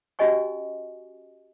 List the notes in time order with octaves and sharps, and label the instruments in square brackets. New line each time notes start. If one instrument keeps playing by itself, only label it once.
[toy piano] C#4 F#4 G4 D#5 G#5 C#6